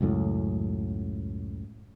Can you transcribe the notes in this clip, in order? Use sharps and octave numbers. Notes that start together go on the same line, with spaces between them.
C#2 F#2 A2